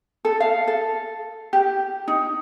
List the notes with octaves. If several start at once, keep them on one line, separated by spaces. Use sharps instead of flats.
A4
F5
A4
G4
D#4